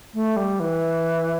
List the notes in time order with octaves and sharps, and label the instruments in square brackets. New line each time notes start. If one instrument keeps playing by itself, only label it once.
[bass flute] A3
G3
E3